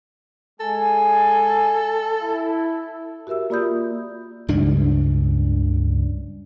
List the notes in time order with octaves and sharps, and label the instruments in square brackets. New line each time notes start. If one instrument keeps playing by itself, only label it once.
[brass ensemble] G#3 G#5 [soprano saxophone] A4
[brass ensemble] E4
[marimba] F#4 G4 A#4 E5 E6
A#3 F4 D5 B5 D#6 G6
[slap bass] C#2 G2 C#3 D4